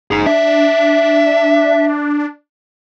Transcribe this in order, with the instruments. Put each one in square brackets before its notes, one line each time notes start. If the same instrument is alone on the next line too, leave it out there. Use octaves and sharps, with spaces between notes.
[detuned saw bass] F#1 [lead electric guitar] D#4 G#4
[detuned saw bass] D4 [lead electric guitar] E5